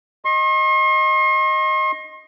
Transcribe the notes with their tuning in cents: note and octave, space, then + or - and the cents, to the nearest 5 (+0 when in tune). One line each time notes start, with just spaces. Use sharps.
D#5 +0 C6 +45